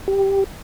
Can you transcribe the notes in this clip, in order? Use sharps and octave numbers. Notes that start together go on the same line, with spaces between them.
G4